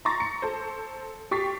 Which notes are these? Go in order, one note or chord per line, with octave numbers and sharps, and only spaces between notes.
A#5 C6 C#6 A6 A#6
C#7
A4 C5
G4 C#6 A6 B6 C7